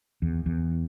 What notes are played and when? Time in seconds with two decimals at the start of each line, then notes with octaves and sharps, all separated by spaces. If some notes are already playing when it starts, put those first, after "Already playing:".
0.22 E2
0.46 E2